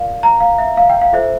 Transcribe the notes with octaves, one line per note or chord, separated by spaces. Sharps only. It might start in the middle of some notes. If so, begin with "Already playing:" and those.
Already playing: F4 A#4 D5 F5
A#5
F5
E5
F5
G5
F5
F4 A4 C5 E5